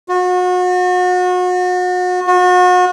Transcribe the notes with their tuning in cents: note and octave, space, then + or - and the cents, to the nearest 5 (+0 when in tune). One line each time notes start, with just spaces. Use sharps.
F#4 -35
F#4 -35